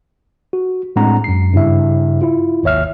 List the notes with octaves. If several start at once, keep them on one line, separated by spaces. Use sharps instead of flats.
F#4
A2 G#3 C4 D4 F#5 A#5
F#2 C7
G2 C#3 E4 E5
E4 F4
G#1 D#2 C#5 E5 F6